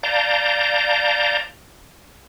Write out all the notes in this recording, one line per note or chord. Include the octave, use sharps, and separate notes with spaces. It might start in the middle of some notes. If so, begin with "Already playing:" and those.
D5 F5 A5 A#5 G6